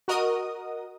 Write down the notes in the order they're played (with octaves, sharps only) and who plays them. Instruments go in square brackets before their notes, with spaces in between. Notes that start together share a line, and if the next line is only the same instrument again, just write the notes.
[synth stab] F#4 A#4 D#5 D#6